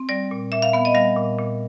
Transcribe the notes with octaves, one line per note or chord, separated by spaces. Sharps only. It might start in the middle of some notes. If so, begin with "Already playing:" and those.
Already playing: C4
G3 D5
A#2
A#2 E5
F5
B3 F5
D#5
G3 F5
A#2
A#2